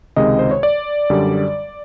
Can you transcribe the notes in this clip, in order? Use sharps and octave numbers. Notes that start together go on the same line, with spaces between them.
C#2 C3 D#3 G#3 D#5
C5
C#5
D5
F#2 D3 G3